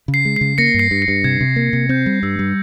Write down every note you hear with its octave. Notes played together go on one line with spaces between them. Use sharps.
C#3
C7
G#3
C7
C#3
A#3 A#6 C#7
G2
C7
G2
C7
G2
C3 G#6
C3
A#3
C3
C4 G6
G3
G2 E6
G3